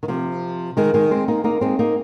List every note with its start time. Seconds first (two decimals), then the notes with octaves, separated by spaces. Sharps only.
0.03 D#3
0.08 C3 F3
0.77 D#3 G#3
0.94 D#3 G#3
1.11 G#3 C4
1.28 A#3 D#4
1.44 A#3 D#4
1.61 G#3 C4
1.79 A#3 D#4